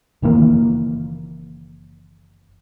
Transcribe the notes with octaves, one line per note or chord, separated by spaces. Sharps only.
F#1 D#3 E3 A#3